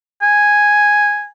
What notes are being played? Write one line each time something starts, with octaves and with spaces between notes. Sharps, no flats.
G#5